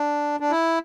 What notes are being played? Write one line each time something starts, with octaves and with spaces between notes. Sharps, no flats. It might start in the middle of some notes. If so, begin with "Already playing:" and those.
Already playing: D4
D4
E4